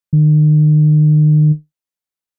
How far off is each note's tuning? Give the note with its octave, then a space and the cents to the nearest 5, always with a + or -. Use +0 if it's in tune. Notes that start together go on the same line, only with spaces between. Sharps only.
D#3 -40